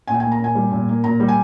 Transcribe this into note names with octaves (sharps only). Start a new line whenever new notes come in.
A#2 G#5
G5
A#3 G#5
A#5
A#2 G#5
G3
A#2
A#3
A#2 A#5
G3
G#5